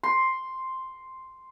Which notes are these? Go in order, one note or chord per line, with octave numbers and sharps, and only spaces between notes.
C6